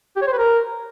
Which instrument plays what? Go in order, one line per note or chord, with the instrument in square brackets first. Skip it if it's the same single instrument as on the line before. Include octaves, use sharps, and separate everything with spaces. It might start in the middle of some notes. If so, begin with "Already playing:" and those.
[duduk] G4
C#5
C5
B4
A#4